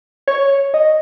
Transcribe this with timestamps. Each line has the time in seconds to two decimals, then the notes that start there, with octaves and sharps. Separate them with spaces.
0.28 C#5
0.74 D#5